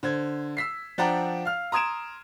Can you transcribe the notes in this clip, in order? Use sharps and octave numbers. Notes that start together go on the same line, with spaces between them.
D3 C5 G#6
E6 B6 C7
F3 D4 D5 F#5 G5 A#5
F5 F6
A#5 C6 D#6 G#6 D7 E7